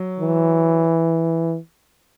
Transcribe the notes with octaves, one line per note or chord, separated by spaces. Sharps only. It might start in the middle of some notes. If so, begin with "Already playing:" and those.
Already playing: F#3
E3